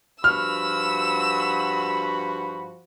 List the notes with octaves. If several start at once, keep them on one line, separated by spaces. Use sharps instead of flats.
G2 F3 F#4 B5 E6 F6